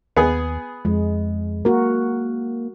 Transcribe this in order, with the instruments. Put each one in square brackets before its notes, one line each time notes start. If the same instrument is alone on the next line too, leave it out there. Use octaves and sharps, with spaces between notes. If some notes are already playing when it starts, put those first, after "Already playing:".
[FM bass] D#2 [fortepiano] B3 G#4
[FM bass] F2 [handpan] G#3
[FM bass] A#3 [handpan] F#4 A#4